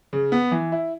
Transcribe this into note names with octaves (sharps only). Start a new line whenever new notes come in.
C#3
B3
E3
E4